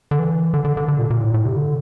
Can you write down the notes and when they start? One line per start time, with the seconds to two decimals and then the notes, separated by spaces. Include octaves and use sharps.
0.11 D3
0.19 E3
0.54 D3
0.65 D3
0.77 D3
0.88 D3
0.99 A#2
1.10 A#2
1.22 A2
1.34 A2
1.45 C3
1.56 D3